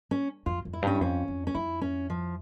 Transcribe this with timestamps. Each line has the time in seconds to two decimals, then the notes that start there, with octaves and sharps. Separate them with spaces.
0.11 C#4
0.46 F2 F4
0.65 F2
0.73 E4
0.82 G2 C#4
0.95 E4
1.01 F2 C#4
1.28 F2
1.47 C#4
1.55 F2 E4
1.81 C#4
2.10 F3